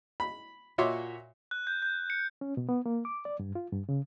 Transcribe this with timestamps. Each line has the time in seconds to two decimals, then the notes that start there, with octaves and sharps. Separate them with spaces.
0.20 B5
0.78 A#2 F#4 C#5 E5 C6 D6
1.51 F#6
1.67 G6
1.82 G6
2.10 C#7
2.41 C#4
2.57 B2
2.69 B3
2.86 A#3
3.05 D6
3.25 D5
3.39 G2
3.55 F4
3.72 G2
3.89 C#3